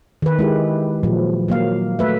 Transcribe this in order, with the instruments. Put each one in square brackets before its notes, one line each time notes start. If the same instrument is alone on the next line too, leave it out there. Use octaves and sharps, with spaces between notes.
[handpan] D#3 B4
G#3 E4 G4
A#2 F3 F#3
F#3 A#3 F5
A3 B4 E5